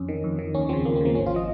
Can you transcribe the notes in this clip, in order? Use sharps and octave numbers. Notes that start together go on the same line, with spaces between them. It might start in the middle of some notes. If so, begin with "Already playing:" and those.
Already playing: F2 C#4
D#3
F2
D#3
D#2 C#4
C#3 F3 C4
D#2 A#3
C4
C#3 F3 A#3
G#1 C#4
F4
F3 D#5